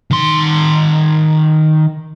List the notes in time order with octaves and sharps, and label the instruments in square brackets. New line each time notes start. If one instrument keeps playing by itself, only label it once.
[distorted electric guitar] D#3 C6